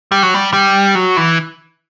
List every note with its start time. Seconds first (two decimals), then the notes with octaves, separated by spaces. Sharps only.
0.12 G3
0.23 F#3
0.34 G3
0.53 G3
0.95 F#3
1.17 E3